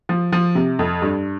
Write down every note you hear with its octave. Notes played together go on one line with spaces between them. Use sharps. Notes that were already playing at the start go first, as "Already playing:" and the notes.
F3
F3
C3
F2
G2